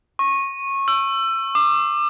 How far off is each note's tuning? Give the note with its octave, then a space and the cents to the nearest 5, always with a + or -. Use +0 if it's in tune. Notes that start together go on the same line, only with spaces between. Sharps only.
C#6 -20
E6 +25
D6 +25